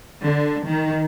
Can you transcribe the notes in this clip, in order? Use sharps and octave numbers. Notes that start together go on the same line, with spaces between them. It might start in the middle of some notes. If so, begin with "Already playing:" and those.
D3
D#3